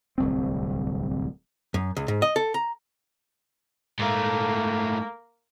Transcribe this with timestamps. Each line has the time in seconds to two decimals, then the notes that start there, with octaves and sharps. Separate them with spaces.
0.18 D1 C2 C4
1.74 F#2
1.97 C#2
2.08 G#2
2.22 D#5
2.36 A4
2.54 A#5
3.99 G#2 A3 A#3